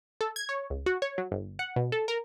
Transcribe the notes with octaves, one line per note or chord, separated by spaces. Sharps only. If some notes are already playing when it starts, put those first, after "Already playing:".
A4
G#6
C#5
C#2
F#4
C#5
F#3
G1
F#5
B2
A4
A#4